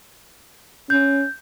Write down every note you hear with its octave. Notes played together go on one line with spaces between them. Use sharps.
C#4 G6